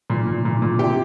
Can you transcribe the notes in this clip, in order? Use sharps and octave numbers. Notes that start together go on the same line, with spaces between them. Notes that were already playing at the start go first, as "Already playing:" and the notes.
A#2
A#2
A#2
A#2
C3 G4